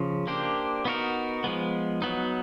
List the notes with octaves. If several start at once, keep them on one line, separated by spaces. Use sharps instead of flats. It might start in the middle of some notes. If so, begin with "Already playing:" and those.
Already playing: C#3 F3
A#3 D4 G4 C5
B3 D#4 F#4 A#4
F3 G#3 B3
F#3 B3 D#4